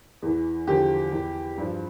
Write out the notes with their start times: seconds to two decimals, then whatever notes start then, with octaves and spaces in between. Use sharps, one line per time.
0.22 E2 E3
0.67 E2 D3 F3 G4
1.12 E2 E3
1.58 G2 F3